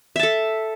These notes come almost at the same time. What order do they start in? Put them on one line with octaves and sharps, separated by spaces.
E5 A5 A4